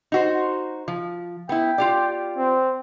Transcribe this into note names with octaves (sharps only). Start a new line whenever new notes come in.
D#4 F#4 C5
F3
B3 E4 G5
F4 G4 D5
C4